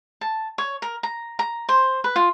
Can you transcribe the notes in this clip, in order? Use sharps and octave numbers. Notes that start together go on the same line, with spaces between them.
A5
C#5
A#4
A#5
A#5
C5
B4
F4